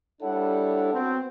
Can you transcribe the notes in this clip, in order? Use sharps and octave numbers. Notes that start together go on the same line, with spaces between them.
G3 D4 E4 A4 C#5 F#5
B3 C4 F#4